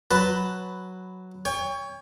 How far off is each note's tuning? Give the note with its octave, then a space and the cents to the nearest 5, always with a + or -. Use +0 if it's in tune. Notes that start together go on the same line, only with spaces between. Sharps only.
F#3 +0 B4 +5 A5 +0
C#5 +20 G5 +40